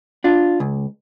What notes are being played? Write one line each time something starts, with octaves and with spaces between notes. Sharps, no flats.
D4 F4
C#2